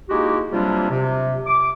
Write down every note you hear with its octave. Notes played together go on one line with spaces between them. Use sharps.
G#3 A#3 D#4 E4 F#4 G4
C3 F#3 G3 A#3 D4 F4
C3
D6